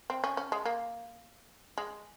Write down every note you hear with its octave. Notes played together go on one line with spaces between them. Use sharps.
C4
C#4
C#4
G#3
A#3
G#3